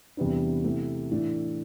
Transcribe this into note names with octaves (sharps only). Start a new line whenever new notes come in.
E2 C3 G3 B3 D4
C3 E3 A3
A2 E3 A3 D4